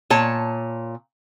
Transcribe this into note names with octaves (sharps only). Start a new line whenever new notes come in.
A#2 C#5 A5